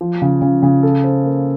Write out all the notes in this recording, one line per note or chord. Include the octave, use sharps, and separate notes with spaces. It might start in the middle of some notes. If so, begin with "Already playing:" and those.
F3
C#3
C#3
C#3
A4
C5
A#3